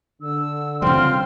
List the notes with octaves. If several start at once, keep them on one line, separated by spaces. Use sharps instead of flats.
D3 E6
C#3 E3 G3 C4 F4 C6 F6